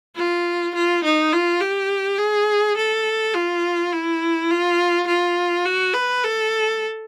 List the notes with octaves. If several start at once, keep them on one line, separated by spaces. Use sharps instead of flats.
F4
F4
D#4
F4
G4
G#4
A4
F4
E4
F4
F4
F#4
B4
A4